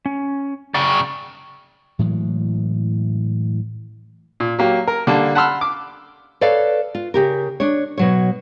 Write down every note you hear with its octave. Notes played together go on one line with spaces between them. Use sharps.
C#4
F#2 C#3 D5 G5 C#6
A2 E3 F#3 G#3
A#2
F#3 A#3 G4
A#4
D3 G3 A#3 A5
F#5 A5 B5 C6 E6 F6
D6
A4 B4 C#5 D5 F5
F4
C#3 G4 A#4
D4 C#5
B2 F#3 C#5